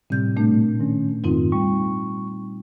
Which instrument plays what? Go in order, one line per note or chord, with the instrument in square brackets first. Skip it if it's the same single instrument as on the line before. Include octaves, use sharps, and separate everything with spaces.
[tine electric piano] A2 C3 G3 [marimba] C4 G6
[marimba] A#2 A3 D4
[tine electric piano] D#3 C#4
[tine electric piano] F2 G#2 D#3 [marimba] C4 D#4 F4
[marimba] G3 [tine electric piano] C#6